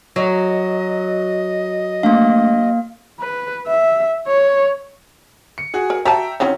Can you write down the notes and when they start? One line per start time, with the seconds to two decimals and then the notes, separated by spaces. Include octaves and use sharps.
0.16 F#3 D#5
2.03 A3 A#3 D4 F5
3.20 B4
3.67 E5
4.27 C#5
5.58 C#7
5.74 F#4 G#4
5.90 A#4
6.05 F#4 D5 E5 G5 A5 A#5
6.40 D#3 E3 F#3 C4 C#4